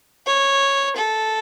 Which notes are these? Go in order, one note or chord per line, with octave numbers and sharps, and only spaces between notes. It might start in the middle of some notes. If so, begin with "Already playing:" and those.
C#5
A4